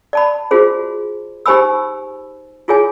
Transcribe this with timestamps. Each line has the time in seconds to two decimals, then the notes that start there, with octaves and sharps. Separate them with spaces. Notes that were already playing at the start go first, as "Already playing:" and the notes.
0.13 D5 A5 B5
0.51 F4 F#4 G#4 C5
1.46 D#4 G4 C5 G#5 B5 E6
2.68 E4 F4 G#4 C#5 G#5